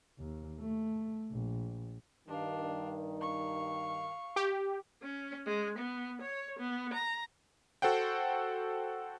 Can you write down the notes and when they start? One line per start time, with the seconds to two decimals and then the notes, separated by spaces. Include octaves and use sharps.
0.18 D#2
0.60 A3
1.32 A#1
2.28 G2 D#3 D4 F5
3.21 F5 C#6
4.36 G4
5.02 C#4
5.46 G#3
5.78 B3
6.22 C#5
6.59 B3
6.94 A#5
7.82 F#4 A4 C5 F#5 G5